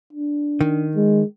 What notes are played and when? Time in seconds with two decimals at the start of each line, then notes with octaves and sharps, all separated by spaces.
0.13 D4
0.61 D#3
0.96 G#3